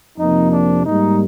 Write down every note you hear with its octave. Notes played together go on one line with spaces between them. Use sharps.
F2 C3 F3 A#3 D#4
D4
G#2 G3 A#3 D#4